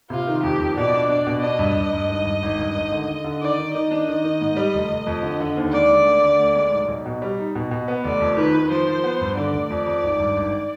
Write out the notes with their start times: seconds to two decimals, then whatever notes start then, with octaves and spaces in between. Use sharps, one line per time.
0.10 C3 F4
0.27 D#3
0.43 F2 G4
0.60 F2
0.76 B2 D5
0.94 D4
1.09 D4 D5
1.27 B2
1.43 D4 D#5
1.59 G2
1.77 G2
1.93 G2
2.09 G#1
2.25 G2
2.43 G#1
2.58 G2
2.75 G#1
2.92 D3
3.08 D3
3.24 D3
3.41 D#3 D5
3.59 D#3
3.75 D#3 D#5
3.91 D4
4.08 D#3
4.25 D#3
4.41 G#2
4.57 G3
4.74 F1
4.90 F1
5.07 F2
5.23 D3
5.40 D3
5.57 D#2
5.73 G#3 D5
5.90 D3
6.06 D2
6.22 D3
6.39 D2
6.56 G#3
6.72 B1
6.88 B1
7.06 B2
7.22 G3
7.39 D#4
7.55 B2
7.71 B2
7.88 B3
8.04 F1 D5
8.20 F2
8.37 D#3 B4
8.54 D#3
8.70 F3 C5
8.87 F3
9.04 B3
9.21 G2
9.37 D3 D5
9.53 F1
9.70 F2
9.86 F2
10.03 G#1
10.19 G2
10.37 G#1